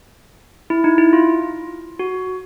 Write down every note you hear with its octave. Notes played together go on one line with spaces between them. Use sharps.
E4
D#4
E4
F4
F#4